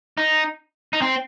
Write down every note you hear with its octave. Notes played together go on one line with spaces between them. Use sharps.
D#4
D#4
C4